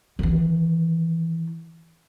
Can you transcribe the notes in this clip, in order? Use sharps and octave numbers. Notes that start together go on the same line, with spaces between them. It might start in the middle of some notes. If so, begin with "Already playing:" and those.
D#3 E3